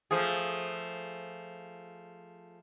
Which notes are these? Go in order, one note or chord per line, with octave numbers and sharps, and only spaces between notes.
F3 A3 G#4